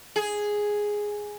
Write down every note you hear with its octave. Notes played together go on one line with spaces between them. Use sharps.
G#4